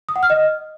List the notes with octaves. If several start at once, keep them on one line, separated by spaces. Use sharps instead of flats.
D#6
F#5
F6
D#5